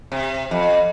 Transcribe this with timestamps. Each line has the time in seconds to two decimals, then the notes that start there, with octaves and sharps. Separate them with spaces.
0.12 C3
0.51 F2